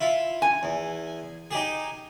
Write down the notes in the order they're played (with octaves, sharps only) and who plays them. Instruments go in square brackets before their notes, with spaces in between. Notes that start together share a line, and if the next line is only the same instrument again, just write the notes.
[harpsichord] E4 F4
[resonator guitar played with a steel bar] G#5
[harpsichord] E2
D#4 G4 G#4